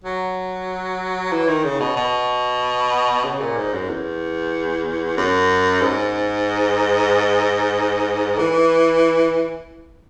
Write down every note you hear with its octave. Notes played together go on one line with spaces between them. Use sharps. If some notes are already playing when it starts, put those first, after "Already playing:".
F#3
E3
D#3
C#3
B2
B2
C#3
A#2
G#2
F#2
E2
F#2
G#2
E3